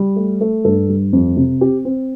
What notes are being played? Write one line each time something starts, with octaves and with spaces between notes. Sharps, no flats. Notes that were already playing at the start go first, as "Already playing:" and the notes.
Already playing: G3
A3
A3
G2 A4
G3
F2
C3
C4 G4
C4